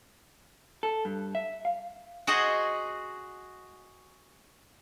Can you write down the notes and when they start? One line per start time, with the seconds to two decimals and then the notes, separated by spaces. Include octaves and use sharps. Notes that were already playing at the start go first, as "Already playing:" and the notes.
0.83 A4
1.05 G2
1.35 E5
1.65 F5
2.27 F#4 G#4 C5 D#5 F#5